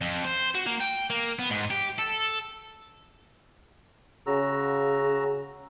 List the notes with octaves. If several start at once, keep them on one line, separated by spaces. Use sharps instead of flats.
F2
C5
F#4
A#3
G5
A#3
B3
G#2
G4
A4
C#3 F#4 A#5 E6